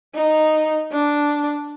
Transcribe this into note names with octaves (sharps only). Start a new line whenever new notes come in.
D#4
D4